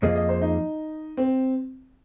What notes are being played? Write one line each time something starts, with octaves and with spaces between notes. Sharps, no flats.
F2 F3 A#3 F4 G#4 D#5
D#5
C5
D#4
C4